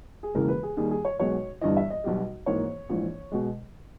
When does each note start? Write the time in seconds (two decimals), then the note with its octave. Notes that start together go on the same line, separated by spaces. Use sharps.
0.23 G#4
0.34 E1 E2 C#3 E3 A#3 A#4
0.48 B4
0.63 G#4
0.77 D#2 D#3 G3 G#4
0.91 G#4
1.05 C#5
1.20 B1 B2 G#3 C#5
1.61 G1 G2 E3 D#5
1.77 E5
1.90 D#5
2.04 B1 B2 G3
2.46 G#1 G#2 E3 A#3 C#5
2.89 A#1 G#2 E3
3.32 B2 G#3